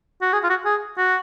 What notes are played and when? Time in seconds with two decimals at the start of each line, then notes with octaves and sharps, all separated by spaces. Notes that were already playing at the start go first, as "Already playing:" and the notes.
0.22 F#4
0.33 G#4
0.44 F4
0.50 F#4
0.65 G#4
0.98 F#4